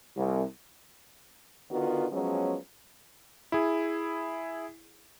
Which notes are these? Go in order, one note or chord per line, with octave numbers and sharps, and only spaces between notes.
C2
D3 D#3 B3 F4 F#4
F3 F#3 G#3 B3 C#4
E4 G#4